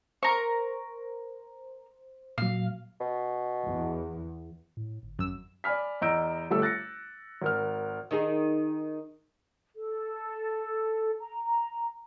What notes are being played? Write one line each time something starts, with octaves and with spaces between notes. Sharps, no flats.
A#4 C5 C#6
A#2 F#3 F5
B2
E2
A2
G1
G#1 F#2 E6
D5 G#5 B5 F6 B6
E2 D#5 A#5 E6 G6 D7
G1 G3 A3 G4 A4 E6
F#6 A6 A#6 C#7
G#1 A#4 F6
D#3 D#4 G#4
A4
A#5